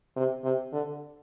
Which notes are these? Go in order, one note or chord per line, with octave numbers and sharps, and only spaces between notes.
C3
C3
D3